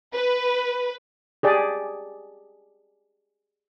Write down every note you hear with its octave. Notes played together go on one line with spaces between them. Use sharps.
B4
G4 G#4 D5